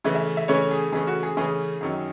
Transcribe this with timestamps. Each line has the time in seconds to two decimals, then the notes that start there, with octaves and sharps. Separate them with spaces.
0.04 C#3 E3 A3 C#4
0.15 E5
0.37 E5
0.48 C#3 E3 A3 C#4 C#5
0.71 G#4
0.92 C#3 E3 A3 C#4 G#4
1.07 F#4
1.23 G#4
1.37 C#3 E3 A3 C#4 G#4
1.81 F#2 D#3 F#3 C#4